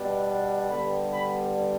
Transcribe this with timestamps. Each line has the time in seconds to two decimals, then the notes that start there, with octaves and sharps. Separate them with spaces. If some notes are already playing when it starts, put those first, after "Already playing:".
Already playing: B2 G3 B3 D4
0.69 G2 D3 G3 B3 B5
1.10 B5